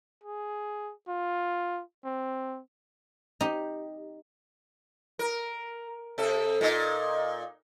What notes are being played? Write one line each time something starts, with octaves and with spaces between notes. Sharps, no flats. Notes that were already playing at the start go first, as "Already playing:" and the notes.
G#4
F4
C4
D#4 G4
A#4
C3 A4
A#2 D#4